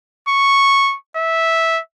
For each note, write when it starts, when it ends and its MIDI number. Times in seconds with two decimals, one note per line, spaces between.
0.29 0.96 85
1.17 1.80 76